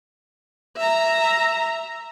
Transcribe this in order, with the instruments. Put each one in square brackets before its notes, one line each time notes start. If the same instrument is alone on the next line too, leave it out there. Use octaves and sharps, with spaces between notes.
[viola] E5 A#5